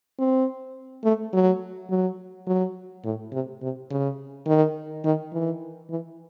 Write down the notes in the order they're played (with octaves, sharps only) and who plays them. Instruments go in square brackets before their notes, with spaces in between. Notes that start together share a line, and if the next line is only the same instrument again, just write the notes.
[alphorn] C4
A3
F#3
F#3
F#3
A2
C3
C3
C#3
D#3
D#3
E3
E3